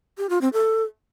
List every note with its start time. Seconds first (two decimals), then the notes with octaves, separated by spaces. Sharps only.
0.18 G4
0.30 F4
0.41 C4
0.53 A4